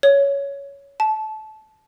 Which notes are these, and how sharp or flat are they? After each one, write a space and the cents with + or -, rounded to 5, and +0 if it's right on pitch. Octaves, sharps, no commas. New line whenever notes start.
C#5 +10
A5 -20